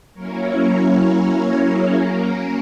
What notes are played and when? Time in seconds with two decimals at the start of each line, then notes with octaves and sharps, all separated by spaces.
0.14 F#3 A#3 C#4 E4 A#4 C#5
0.44 A#4
0.74 A#4
1.04 A#4
1.34 A#4
1.63 G#4
1.93 F#3 A#3 C#4 A#4